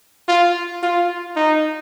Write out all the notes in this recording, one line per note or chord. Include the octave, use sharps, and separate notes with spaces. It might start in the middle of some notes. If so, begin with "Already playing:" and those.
F4
F4
D#4